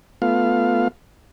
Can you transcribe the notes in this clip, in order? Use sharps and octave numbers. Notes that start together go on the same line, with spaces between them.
A3 B3 F4 F5